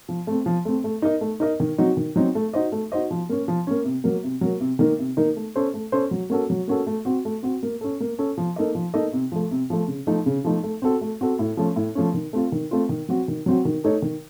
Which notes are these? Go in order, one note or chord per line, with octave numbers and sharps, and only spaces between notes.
F3
A3 C4
F3
A3 C4
A3
D#4 A#4 D#5
A3
D#4 A#4 D#5
D#3
F#3 C4 D#4 F#4
D#3
F#3 C4 D#4 F#4
A3
D#4 F#4 C5 D#5
A3
D#4 F#4 C5 D#5
F3
A#3 C#4
F3
A#3 C#4
C3
F#3 A#3
C3
F#3 A#3
C3
D#3 A#3 D#4 A#4
C3
D#3 A#3 D#4 A#4
A3
C#4 A4 C5
A3
C#4 A4 C5
F#3
A#3 C#4 F#4 A4
F#3
A#3 C#4 F#4 A4
A3
C4 F#4
A3
C4 F#4
A#3
C#4 A4
A#3
C#4 A4
F3
A#3 D#4 A4 D#5
F3
A#3 D#4 A4 D#5
C3
F3 A3
C3
F3 A3
C#3
F3 A3 D#4
C#3
F3 A3 D#4
A3
C4 F#4 A4
A3
C4 F#4 A4
A2
F3 A3 C#4
A2
F3 A3 C#4
D#3
A3 C4 F4
D#3
A3 C4 F4
D#3
F#3 C4 F#4
D#3
F#3 C4 F#4
D#3
A3 D#4 A4 C#5
D#3